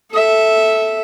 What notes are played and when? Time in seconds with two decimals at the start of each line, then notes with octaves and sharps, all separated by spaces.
0.11 A4 E5